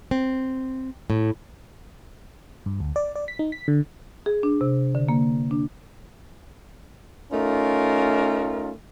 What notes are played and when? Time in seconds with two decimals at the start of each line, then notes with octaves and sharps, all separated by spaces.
0.11 C4
1.10 A2
2.66 G2
2.80 D2
2.96 D5
3.15 D5
3.28 B6
3.39 D#4
3.52 B6
3.68 D3
4.26 G#4
4.43 D4
4.61 C3
4.95 D3
5.09 A#3
5.51 D4
7.33 A3 C#4 D#4 F4 A#4